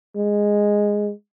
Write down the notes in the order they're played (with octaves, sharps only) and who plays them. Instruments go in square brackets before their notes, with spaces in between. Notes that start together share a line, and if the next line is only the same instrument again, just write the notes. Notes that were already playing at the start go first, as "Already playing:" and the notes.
[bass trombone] G#3